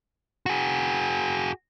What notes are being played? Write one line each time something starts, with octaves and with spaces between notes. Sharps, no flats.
F#4 G#4